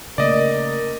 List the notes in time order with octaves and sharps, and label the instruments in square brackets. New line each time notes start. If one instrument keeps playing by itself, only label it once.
[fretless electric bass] C#3 A3 A#3 [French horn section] A#4 [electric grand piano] D5 D#5